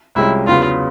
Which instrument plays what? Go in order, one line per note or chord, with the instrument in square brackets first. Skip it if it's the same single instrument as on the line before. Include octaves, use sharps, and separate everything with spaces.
[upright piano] C2 C3 F3 G#3 C#4 [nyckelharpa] E4
[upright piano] E2 C#3 F#3 B3 [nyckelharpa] F4